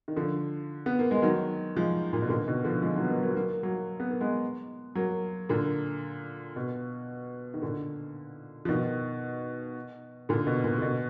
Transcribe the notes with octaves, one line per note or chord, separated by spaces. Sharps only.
D#3
D3 F3
B3
A#3
G#3
D#3 F#3
F3 G#3
A#2
B2
A#2 D3
B2 D#3
D3 F3
F3 G#3
D#3 F#3
B3
F#3 A#3
F#3 A#3
B3
F#3 A#3
F#3 A#3
B3
A#3
G#3 B3
F#3 A#3
A#2 D3
B2
D#3
A#2 D3
F3
B2 D#3
A#2 D3
B2
A#2
D3
B2